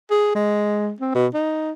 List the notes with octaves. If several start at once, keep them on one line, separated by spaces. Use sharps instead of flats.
G#4
G#3
C4
B2
D#4